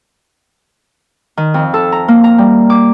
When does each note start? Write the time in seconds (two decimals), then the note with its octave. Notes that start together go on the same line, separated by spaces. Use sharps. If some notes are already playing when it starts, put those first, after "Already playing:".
1.37 D#3
1.54 F2
1.74 A4
1.92 A#5
2.08 A#3
2.24 A#5
2.38 G3
2.70 D6